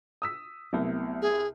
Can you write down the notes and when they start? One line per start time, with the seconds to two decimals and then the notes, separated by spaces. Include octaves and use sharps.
0.22 D#6 E6 B6
0.73 C2 C3 F#3 A3 B3
1.22 G#4